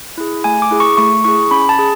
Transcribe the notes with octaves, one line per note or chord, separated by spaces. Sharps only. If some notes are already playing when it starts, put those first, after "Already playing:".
E4 G#4
A3 G#5
D6
E4 G#4
C#6
A3 C#6
E4 G#4 C#6
C#4 B5
A5
G#4